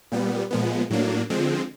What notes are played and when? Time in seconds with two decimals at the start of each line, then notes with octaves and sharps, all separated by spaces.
0.12 A#2 G3 B3
0.51 A#2 F3 G#3 B3
0.90 A2 F#3 A#3 D4
1.30 D3 F3 G#3 C4